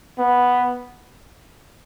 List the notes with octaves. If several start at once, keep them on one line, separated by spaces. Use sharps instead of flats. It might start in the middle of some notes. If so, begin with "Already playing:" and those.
B3